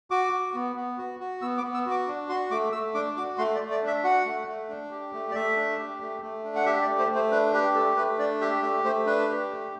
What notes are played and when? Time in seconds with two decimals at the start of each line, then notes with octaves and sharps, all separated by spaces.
0.11 F#4 D6
0.33 F#4
0.54 B3
0.76 B3
0.98 F#4
1.20 F#4
1.42 B3 E6
1.58 D6
1.63 B3
1.74 E6
1.86 F#4 D6
2.07 D4
2.29 F#4 C6
2.51 A3 D6
2.72 A3 E6
2.94 D4 D6
3.17 F#4 D6
3.38 A3 C6
3.55 D5
3.60 A3
3.71 D5
3.82 D4
3.87 E5
4.04 F#4 F#5
4.26 A3
4.48 A3
4.69 D4
4.91 G4
5.13 A3
5.31 D5
5.35 A3 E5
5.57 D4
5.78 G4
6.01 A3
6.22 A3
6.44 D4
6.56 F#5
6.66 G4 E5
6.82 D5
6.88 A3
6.98 C5
7.09 A3
7.15 C5
7.31 D4 B4
7.53 G4 B4
7.75 A3 A4
7.97 A3 B4
8.19 D4 D5
8.41 G4 E5
8.63 A3 E5
8.84 A3 C5
9.06 D4 B4
9.28 G4
9.50 A3